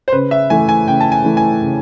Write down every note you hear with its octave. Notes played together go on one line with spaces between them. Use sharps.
C5
C#3 B4
E5
E3 A3 G#5
G#5
C#3 G5
A5
G#5
E3 A3
G#5
C#3